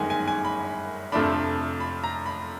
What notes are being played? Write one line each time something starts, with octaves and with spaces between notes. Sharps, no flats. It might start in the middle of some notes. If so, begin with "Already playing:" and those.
Already playing: G1 F#2 D#3 G#3 G#5
G#5
G#5
B5
F2 C3 F3 A3 D4 B5
B5
A#5
B5